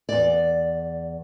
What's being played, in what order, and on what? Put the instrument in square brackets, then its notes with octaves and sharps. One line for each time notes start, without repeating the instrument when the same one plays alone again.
[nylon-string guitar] E2 D5